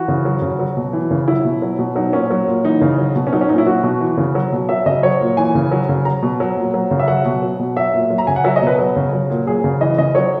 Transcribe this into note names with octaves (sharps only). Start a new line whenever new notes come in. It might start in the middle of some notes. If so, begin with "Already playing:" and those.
Already playing: E3 F#4
C#3
F#3
C#3
F#3
B2
E3
C#3
F#3 E4
B2
F#3
B2
F#3 D#4
A#2 C#4
F#3
A#2
E3 D#4
C#3
F#3
B2
C#4
F#3 D#4
C#4
A#2 D#4
E4
F#3 F#4
B2
E3
C#3
F#3
B2
F#3 E5
C#3 D#5
F#3 C#5
A#2
E3 G#5
C#3
F#3
C#3
F#3 A#5
B2
F#3
A#2
F#3
C#3
E5
F#3 F#5
B2
F#3
B2
F#3 E5
A#2
F#3
A#5
C#3 G#5
F#5
F#3 E5
D#5
B2
B4
F#3
C#3
F#3
A#2
F#3 G#4
C#3
E3 D#5
C#3 D#5
F#3 C#5